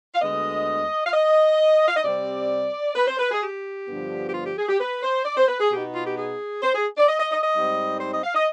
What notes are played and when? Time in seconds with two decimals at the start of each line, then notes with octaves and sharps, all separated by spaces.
0.15 F5
0.21 D2 D3 G#3 B3 D#5
1.07 F5
1.14 D#5
1.88 F5
1.96 D#5
2.04 C3 G3 C4 D5
2.96 B4
3.08 C5
3.19 B4
3.31 G#4
3.42 G4
3.88 G2 D3 F3 B3 D4
4.29 G4
4.34 F4
4.46 G4
4.57 G#4
4.69 G4
4.80 B4
5.03 C5
5.25 D5
5.37 C5
5.48 B4
5.60 G#4
5.71 B2 B3 D#4 G4
5.94 F4
6.06 G4
6.17 G#4
6.63 C5
6.75 G#4
6.98 D5
7.08 D#5
7.20 D#5
7.32 D#5
7.43 D#5
7.54 G#2 G3 C4 D#4
8.00 C5
8.12 D#5
8.24 F5
8.35 D#5